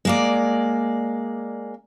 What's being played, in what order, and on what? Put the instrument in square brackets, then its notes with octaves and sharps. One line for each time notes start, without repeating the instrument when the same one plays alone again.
[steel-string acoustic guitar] G#3 A#3 D5